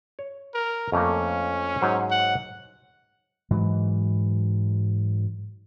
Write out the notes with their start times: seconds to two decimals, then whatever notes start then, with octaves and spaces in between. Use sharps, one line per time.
0.19 C#5
0.54 A#4
0.92 F2 A3 A#3 C#4
1.81 G#2 F#3 C5
2.11 F#5
3.51 G#2 E3 F#3